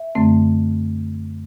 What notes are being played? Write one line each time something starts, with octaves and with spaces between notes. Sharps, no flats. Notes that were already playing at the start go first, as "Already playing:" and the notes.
Already playing: E5
F#2 D3 A3 C4